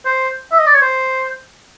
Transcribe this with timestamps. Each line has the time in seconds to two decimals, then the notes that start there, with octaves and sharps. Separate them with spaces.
0.05 C5
0.52 E5
0.59 D#5
0.66 D5
0.74 C#5
0.81 C5